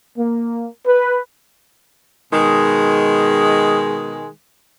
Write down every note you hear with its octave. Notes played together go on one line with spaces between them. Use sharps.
A#3
B4
B2 D#3 G#3